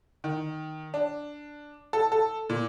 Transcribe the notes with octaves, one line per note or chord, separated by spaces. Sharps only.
D#3
D4
A4
A4
A#2